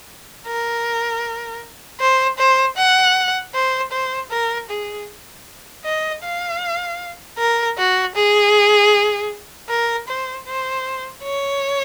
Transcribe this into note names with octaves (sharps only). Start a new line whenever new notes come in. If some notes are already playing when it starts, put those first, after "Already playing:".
A#4
C5
C5
F#5
C5
C5
A#4
G#4
D#5
F5
A#4
F#4
G#4
A#4
C5
C5
C#5